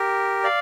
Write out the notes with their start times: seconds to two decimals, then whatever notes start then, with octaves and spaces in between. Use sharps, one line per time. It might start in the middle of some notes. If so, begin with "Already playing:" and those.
Already playing: G4 A#4
0.44 D5 F5